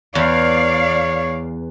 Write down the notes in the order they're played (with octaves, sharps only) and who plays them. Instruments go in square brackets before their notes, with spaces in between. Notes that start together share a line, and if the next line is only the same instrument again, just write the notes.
[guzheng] E2 [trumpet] C#5 [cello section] D5 F5